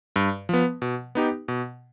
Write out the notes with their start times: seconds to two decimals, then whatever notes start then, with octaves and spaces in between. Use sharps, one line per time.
0.16 G2
0.49 F3 B3
0.82 B2
1.15 B3 D#4 G4
1.48 B2